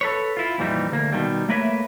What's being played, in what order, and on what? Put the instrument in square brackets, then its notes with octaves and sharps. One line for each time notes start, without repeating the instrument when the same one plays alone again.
[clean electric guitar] A4 B4 C#5
E4 F4
F2 A#2 E3 G3 D#4
D2 A#3
B2 D#3 G3
A3 A#3 A#4 B4 C#5 E5